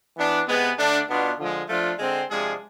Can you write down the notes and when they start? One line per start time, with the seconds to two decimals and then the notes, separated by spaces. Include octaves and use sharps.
0.17 E3 B3 D4
0.47 C3 G#3 B3
0.78 D3 A3 D4
1.08 B2 B3 D4 F4
1.39 D3 F3 G#3
1.69 F3 A3 D4 F4
1.99 D3 G#3 C4
2.29 C3 F3 G#3 D4 G#4